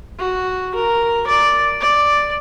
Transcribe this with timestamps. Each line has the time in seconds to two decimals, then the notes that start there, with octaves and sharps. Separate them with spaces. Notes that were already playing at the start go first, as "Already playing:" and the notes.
0.18 F#4
0.75 A#4
1.27 D5
1.80 D5